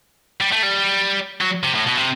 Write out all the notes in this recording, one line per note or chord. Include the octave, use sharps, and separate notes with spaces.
G3
A3
G3
F#3
C3
A2
B2
C3